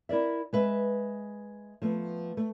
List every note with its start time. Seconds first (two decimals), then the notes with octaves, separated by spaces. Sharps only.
0.09 E4 A#4 D5 E5
0.53 G#3 B4 E5
1.82 F3 A3 B3
2.37 A3